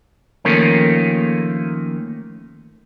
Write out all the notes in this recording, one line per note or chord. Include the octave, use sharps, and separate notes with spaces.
D#3 F3 A3 A#3 C#4